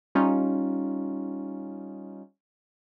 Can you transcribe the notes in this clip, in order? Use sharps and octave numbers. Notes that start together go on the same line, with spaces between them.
G3 C#4 D#4 F4